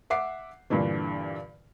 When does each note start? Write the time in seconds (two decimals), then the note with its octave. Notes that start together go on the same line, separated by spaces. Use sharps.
0.10 E5 F#5 D6 C7
0.70 G2 A#2 D3 E3